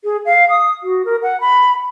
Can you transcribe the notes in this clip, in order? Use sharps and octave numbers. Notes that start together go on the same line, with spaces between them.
G#4
F5
D#6
F#4
A#4
F#5
B5